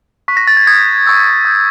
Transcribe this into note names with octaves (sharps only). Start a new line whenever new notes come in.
C#6 F#6 B6
A#6
A6
G#6
D#6 G6 G#6
C#6 E6 G6
D#6 G6